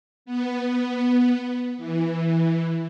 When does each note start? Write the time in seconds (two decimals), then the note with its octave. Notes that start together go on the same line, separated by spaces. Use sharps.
0.26 B3
1.78 E3